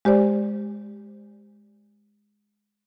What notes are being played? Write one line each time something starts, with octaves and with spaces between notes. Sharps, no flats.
G#3 G4 C5 D5